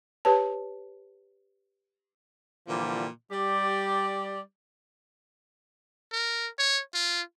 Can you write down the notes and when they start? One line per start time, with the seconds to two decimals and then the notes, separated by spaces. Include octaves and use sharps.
0.25 G4 B4 C#5 A5
2.68 A#2 D3 E3 F3 G3 A#3
3.32 G3 G4 D5
6.12 A#4
6.59 C#5
6.95 F4